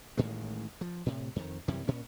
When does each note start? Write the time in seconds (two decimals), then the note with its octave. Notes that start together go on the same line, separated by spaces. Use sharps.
0.17 A1 A2 D#3 G#3
0.81 F3
1.06 A2 C3
1.36 F2 D#3
1.68 F#2 C3 E3 G3
1.88 A#2 C#4